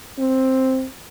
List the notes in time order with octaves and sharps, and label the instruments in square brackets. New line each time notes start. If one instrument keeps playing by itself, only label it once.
[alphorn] C4